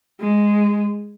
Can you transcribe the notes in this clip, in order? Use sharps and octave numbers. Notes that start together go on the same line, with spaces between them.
G#3